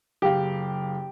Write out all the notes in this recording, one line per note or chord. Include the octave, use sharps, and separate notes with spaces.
F#1 G4 F5